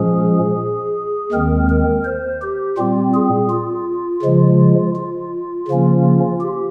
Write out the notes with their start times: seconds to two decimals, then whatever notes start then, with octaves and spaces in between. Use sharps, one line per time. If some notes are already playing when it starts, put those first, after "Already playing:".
Already playing: A#2 F3 G#3 C#4 G#4
1.32 D#2 D#3 G#3 C4 A#4
1.69 A#4
2.05 C5
2.41 G4
2.77 A#2 G3 C4 F4
3.14 G#4
3.50 F4
4.23 C#3 F3 G#3
4.95 F4
5.68 C#3 F3 A#3 C#4
6.40 G4